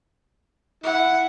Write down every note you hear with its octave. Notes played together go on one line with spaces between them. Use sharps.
E4 F#5